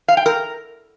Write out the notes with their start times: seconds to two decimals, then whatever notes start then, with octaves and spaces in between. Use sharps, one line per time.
0.08 F5
0.17 G5
0.26 A#4